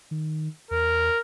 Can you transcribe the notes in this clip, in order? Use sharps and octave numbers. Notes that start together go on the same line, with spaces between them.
D#3
E2 A#4